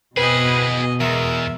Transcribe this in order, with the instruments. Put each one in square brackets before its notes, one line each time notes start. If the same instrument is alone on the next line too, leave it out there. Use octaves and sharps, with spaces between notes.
[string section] B2 [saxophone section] C4 B4 [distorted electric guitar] E4 G#4 [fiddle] D#5 G#5
[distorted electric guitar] E2 [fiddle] G#3 [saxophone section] A#4 E5